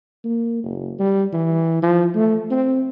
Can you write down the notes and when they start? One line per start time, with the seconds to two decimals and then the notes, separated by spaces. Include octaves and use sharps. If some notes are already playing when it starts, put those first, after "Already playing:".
0.24 A#3
0.64 F#1
0.99 G3
1.33 E3
1.83 F3
2.14 A3
2.51 C4